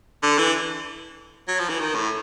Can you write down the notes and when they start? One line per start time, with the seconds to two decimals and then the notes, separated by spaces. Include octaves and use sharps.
0.23 D3
0.38 E3
1.48 F#3
1.59 F3
1.69 E3
1.79 D#3
1.95 A2